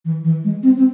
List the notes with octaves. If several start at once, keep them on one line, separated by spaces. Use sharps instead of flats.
E3
E3
G#3
C4
C4